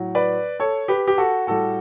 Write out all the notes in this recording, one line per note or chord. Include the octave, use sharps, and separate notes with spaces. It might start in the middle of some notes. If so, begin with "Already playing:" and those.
Already playing: A2 F#3
B4 D5
A4 C#5
G4 B4
G4
F#4 A4
A2 G3 F#4 A4